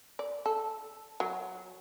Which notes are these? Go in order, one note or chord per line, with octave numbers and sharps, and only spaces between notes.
D5
A4
F#3